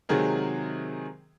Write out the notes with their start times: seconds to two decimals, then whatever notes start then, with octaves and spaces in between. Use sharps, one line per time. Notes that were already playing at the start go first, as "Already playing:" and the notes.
0.09 C3 D#3 F#3 G#3 G#4 A#4